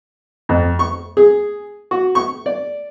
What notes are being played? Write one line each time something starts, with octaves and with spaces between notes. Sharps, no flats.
F2
C#6
G#4
F#4
C#6
D5